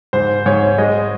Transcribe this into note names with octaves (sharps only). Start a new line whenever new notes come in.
G#2 C5
G#2 C#5
G#3 D#5